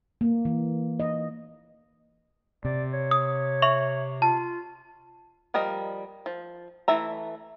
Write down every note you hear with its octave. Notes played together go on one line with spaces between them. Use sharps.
A#3
E3
D#5
C3 D5
C#5
D#6
E5 C#6 F7
F4 A5
F3 G3 A#4 D#5
F3
E3 A3 E5 A#5